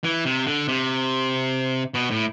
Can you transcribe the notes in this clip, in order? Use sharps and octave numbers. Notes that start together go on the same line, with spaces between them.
E3
C3
D3
C3
B2
A2